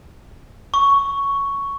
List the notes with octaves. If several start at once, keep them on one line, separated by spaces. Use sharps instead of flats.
C#6